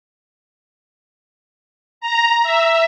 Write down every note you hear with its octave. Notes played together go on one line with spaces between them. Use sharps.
A#5
E5